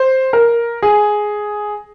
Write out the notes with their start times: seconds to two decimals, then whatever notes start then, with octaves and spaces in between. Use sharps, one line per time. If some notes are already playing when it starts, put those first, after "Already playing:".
Already playing: C5
0.33 A#4
0.82 G#4